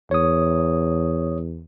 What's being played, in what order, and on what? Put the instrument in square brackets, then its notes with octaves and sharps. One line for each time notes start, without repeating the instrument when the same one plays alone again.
[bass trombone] E2 [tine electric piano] C#5 D#6